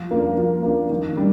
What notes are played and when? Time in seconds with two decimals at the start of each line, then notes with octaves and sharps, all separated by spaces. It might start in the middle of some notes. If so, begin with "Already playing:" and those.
Already playing: F3
0.11 A#3 D4
0.37 F3
0.63 A#3 D4
0.90 D#3
1.17 G3 D4